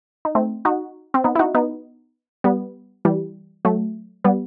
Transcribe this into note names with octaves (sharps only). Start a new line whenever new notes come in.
D#4
A3 C4
D#4 F#4
C4
B3 D#4
E4
D#4 F#4
B3 D#4
G3 B3
E3 G3
F#3 A3
G3 B3